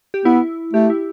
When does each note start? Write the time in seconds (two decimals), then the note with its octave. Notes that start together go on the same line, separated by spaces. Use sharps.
0.14 G4
0.25 B3 E4
0.73 A3 G4
0.90 E4